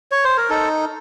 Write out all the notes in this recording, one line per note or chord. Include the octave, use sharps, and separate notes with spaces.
C#5
C5
A#4
D#4 A4